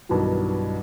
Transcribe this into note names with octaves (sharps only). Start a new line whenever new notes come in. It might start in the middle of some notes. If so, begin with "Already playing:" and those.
B1 G2 D#3 E3 F#3